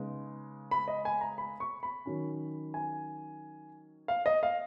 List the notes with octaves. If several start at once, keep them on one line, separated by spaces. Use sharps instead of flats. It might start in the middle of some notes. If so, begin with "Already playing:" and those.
Already playing: C#3 G#3 B3 D#4
B5
D#5
G#5
A#5
B5
C#6
B5
D#3 F#3 C#4
G#5
F5
D#5
F5